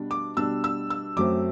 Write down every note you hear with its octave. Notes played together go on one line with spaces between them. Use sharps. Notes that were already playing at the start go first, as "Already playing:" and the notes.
Already playing: B2 G3 D4
D6
B2 G3 D4 E6
E6
E6
F#2 F#3 A3 C4 D6